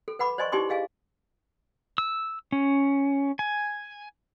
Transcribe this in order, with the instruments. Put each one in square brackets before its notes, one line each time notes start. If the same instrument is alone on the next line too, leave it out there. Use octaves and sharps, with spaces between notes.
[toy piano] A4
B4 F#5 B5 D6
C5 D5 D#5 G#5 C6 C#6
D#4 E4 G4 G#5 C6 D6
G#4 D#5 F5 G#5
[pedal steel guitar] E6
C#4
G#5